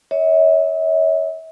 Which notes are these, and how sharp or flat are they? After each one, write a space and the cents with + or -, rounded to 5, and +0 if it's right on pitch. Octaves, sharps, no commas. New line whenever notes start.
C#5 +15 E5 -40